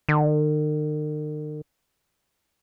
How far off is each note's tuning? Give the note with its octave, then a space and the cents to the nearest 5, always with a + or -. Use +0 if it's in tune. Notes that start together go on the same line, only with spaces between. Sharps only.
D#3 -45